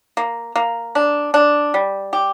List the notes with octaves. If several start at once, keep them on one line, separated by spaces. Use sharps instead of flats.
A#3
A#3
D4
D4
G3
G4